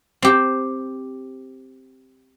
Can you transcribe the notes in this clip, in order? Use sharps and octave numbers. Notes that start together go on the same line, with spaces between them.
C4 G4